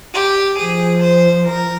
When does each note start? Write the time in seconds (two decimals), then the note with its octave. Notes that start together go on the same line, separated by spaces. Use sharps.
0.14 G4
0.58 F3 G#4
1.03 C5
1.48 A#4